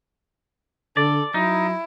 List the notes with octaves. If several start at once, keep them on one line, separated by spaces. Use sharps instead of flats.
D3 A4 D5
F#3 D#4 E4